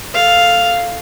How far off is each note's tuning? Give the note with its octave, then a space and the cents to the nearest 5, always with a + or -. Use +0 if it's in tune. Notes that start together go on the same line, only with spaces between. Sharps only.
A4 +0 F5 +0